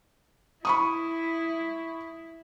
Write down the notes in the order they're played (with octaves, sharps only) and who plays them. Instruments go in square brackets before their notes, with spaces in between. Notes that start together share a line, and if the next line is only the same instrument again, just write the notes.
[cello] E4 [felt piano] B5 C#6 D#6